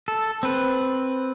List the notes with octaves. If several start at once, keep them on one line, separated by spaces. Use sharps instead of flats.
A4
C4 B4